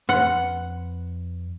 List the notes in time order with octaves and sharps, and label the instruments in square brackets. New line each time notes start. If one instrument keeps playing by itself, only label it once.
[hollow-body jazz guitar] F2 B4 C6 [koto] F#5